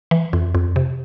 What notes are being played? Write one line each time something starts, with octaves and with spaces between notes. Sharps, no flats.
E3
F2
F2
C3